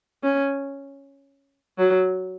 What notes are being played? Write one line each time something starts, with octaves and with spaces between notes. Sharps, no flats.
C#4
F#3